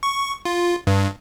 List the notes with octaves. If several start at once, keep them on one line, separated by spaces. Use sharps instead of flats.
C#6
F4
G2